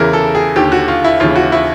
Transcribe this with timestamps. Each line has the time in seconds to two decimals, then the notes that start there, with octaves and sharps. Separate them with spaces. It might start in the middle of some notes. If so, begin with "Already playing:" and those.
Already playing: E2 C#3 E3 A#4
0.13 A4
0.35 G#4
0.56 D#2 D3 G4
0.72 F#4
0.88 F4
1.04 E4
1.20 D#2 C#3 E3 F4
1.36 F#4
1.52 E4